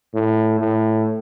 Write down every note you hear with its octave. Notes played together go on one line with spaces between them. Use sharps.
A2
A2